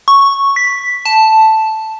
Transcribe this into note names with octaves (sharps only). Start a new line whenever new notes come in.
C#6
B6
A5